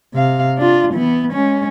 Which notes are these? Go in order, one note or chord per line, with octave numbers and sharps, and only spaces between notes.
C3 F5
D4 F4
E3 B3
G#3 C#4